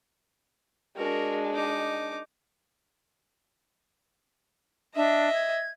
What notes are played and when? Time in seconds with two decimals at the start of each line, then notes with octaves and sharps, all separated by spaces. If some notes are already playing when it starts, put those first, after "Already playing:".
0.97 G#3 D4 F#4 A#4
1.53 D#4 D6
4.96 D4 D#5 E5
5.33 G#6